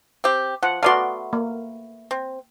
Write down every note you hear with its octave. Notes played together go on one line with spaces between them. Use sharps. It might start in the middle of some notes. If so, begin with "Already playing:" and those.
C4 G4
F3 F#5
A3 B3 F#4 D5 F5 C6
A#3
C4